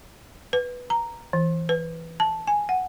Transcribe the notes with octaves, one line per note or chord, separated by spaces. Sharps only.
B4
A#5
E3
B4
A5
G#5
F#5